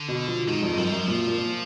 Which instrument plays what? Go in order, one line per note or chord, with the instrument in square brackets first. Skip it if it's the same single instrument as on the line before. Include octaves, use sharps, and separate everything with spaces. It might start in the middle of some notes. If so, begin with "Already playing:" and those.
Already playing: [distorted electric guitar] D3
[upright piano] B2
F3
[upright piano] G#2 [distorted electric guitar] D#3
[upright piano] F2
G#2
[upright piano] F#2 [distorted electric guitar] F3
[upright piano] F#2
A#2
A#2
A#2